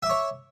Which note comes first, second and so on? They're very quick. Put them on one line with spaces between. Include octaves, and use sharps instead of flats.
E5 D6 C#5